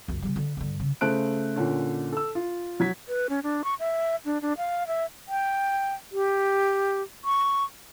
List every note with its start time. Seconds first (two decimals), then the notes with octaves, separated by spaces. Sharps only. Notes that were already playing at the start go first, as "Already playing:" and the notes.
0.08 C#2 F#2
0.22 C#3 G3
0.36 D3
0.57 G2 D3
0.80 C#3
1.01 C#3 A3 C5 F#6 D7
1.56 A#2 D3 C#4
2.12 A4 E6
2.35 F4
2.80 F#3 G#6 B6
3.08 B4
3.29 C#4
3.43 D4
3.64 C#6
3.79 E5
4.25 D4
4.42 D4
4.58 F5
4.87 E5
5.28 G5
6.12 G4
7.25 C#6